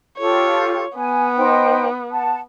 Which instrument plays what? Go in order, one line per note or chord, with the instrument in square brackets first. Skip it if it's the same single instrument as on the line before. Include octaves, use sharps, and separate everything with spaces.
[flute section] F4 G4 A4 [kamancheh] C#5
[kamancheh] B3 [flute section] G#5
[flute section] D#4 C5 G5
F#5 A5